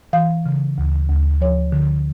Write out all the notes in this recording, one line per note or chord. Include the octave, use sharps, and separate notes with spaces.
E3 F5
C#3
D2
D2
F3 C#5
D3